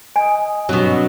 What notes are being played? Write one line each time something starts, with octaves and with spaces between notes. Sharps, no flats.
D#5 G#5 D#6
B2 F#3 C4 D4 F#4